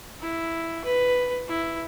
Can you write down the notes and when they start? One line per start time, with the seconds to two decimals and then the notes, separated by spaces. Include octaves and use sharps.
0.20 E4
0.85 B4
1.48 E4